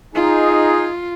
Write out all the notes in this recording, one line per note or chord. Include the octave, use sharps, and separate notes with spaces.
D#4 F4 G#4